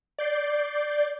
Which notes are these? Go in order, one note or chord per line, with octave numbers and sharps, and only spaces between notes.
D5 G6 C7